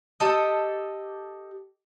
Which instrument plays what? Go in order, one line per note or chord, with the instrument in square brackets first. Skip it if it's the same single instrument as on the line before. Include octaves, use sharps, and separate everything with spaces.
[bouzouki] G4 A4 D#5